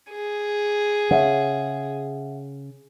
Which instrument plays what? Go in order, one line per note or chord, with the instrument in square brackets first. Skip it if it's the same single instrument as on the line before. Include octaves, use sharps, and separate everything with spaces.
[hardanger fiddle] G#4
[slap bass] C#3 [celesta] E5 F#5